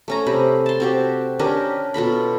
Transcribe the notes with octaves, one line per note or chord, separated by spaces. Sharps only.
A3 C#4 A#5
C3 B5
A5 C6
C4 F#4 G4
C#4 D4 G4 A#4
B2 F4 A4 B5